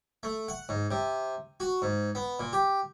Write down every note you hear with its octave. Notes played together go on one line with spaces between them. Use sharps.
A3
F#5
G#2
C3
F#4
G#2
B3
A#2
G4